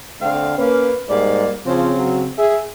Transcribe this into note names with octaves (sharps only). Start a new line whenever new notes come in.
D3 A3 C4 F5
A#3 C#4 B4
G#2 G3 A#3 D5
C#3 F3 C4
F#3
G#4 E5